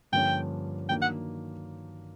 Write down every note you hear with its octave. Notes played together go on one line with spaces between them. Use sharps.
G2 D3 F3 A#3 C#4 G5
D#3 F#3 A#3 D4 G5
F#5